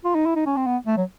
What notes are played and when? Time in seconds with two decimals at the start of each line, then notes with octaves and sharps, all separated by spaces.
0.05 F4
0.15 D#4
0.26 E4
0.36 D#4
0.46 C#4
0.57 C4
0.66 B3
0.87 A3
0.97 F#3